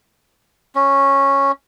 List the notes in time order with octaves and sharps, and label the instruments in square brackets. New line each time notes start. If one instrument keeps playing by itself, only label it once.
[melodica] C#4